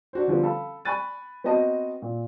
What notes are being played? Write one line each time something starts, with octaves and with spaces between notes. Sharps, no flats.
D4 F#4 C5
D3 F3 G3 B3
A4 F5 B5
G#5 B5 C#6 F#6 A6 D#7
B3 C4 F#4 D#5 A5
A#2